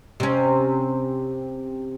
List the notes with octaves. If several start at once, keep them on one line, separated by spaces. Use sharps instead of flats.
C3 C#4